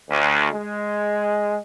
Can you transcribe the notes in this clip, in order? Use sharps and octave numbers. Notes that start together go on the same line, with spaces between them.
D2
G#3